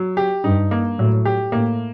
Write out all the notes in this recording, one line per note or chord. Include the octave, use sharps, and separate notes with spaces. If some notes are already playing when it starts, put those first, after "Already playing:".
Already playing: F#3
G4
G2 D#4
A#3
A2 F#3
G4
A2 A#3